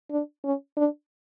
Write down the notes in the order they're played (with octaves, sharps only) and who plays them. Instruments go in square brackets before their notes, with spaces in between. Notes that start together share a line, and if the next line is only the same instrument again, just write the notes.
[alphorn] D4
C#4
D4